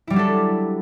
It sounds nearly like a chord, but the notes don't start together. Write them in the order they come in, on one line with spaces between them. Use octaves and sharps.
E4 G3 F#3 D4 A4